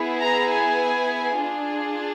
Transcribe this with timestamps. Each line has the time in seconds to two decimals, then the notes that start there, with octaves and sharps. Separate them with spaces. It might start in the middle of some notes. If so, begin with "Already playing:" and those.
Already playing: B3 E4 G#4
0.22 A#5
0.51 G#5
1.40 D4 F4 G#4